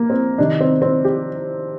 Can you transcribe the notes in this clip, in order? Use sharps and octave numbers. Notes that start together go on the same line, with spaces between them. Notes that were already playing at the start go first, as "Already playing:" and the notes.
Already playing: A#3
C4
C3 D#3 D4
C4
C4
G4